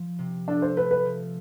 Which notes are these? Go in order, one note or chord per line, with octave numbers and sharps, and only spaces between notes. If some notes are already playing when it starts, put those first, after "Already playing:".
Already playing: F3
C3
D4 A4
C5
A3 B4
B4
F3